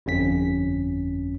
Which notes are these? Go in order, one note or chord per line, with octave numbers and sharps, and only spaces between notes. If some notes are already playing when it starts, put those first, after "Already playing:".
G1 F2 C#4 B6